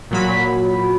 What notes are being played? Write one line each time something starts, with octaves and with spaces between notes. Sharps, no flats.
A#2 F#3 B5